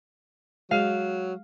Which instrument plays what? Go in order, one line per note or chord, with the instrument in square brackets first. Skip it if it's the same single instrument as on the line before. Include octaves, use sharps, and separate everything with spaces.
[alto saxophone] F#3 [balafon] G#3 G#4 [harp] F5